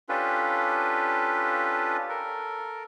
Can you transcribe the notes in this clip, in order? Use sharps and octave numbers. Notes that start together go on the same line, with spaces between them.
C#4 D4 F4 G4 A4 B4
A4 A#4